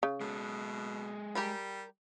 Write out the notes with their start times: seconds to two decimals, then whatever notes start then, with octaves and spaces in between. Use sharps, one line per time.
0.03 C#3
0.21 B2 G#3 A4
1.35 G3 G4 A#4 B5